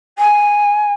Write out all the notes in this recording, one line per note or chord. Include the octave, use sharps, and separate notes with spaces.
G#5